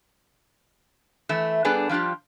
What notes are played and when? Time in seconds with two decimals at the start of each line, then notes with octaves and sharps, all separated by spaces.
1.29 E3 A3 E5
1.65 G3 B3 D4 G#4 A4 B4
1.89 F3 G3 D4 F4 G4